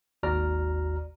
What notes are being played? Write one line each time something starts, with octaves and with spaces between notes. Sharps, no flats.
G#1 D#2 F#4 D5 A#5 F6